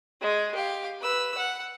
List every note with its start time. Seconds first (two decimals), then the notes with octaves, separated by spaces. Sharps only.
0.21 G#3 G#4
0.54 G4 F5
1.01 B4 E6
1.37 F#5